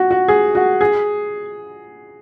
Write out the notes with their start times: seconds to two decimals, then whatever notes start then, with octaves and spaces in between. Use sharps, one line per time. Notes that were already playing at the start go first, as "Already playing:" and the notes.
Already playing: F#4
0.11 F#4
0.28 G#4
0.55 F#4
0.81 G#4